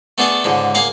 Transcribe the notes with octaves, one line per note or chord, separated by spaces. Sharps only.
A3 B3 D4 G#4 A4
C#2 G#2 D3
A#3 G#4 A#4 F5 F#5